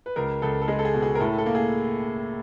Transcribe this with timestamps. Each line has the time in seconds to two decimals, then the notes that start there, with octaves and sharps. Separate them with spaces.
0.06 B4
0.16 C#2 A#4
0.42 C#2 A4
0.62 A4
0.68 G#3 G#4
0.79 A4
0.85 G#4
0.94 B2
1.02 G#4
1.15 A#4
1.20 A2 A4
1.38 A4
1.46 A#3
1.55 G#4